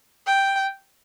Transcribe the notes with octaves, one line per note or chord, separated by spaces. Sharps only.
G5